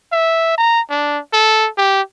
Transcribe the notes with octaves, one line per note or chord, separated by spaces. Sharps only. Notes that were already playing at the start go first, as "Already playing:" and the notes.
E5
A#5
D4
A4
G4